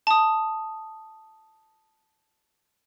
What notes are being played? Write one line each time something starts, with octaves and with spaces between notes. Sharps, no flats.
A5 D#6